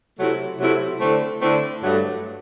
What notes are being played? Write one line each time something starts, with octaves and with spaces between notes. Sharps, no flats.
C3 F#3 A3 E4
C3 F#3 A3 E4
D3 A3 C4 E4
D3 A3 C4 E4
G2 F#3 A3